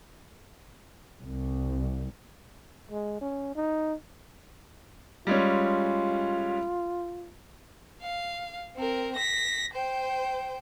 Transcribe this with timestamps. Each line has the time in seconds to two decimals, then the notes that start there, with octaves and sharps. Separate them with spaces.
1.22 C2
2.91 G#3
3.21 C#4
3.55 D#4
5.27 G3 G#3 C#4 F4
8.02 F5
8.77 C4 A#4
9.16 A#6 B6
9.74 C5 G5